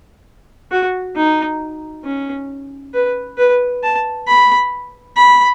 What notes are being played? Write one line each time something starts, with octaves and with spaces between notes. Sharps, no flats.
F#4
D#4
C#4
B4
B4
A5
B5
B5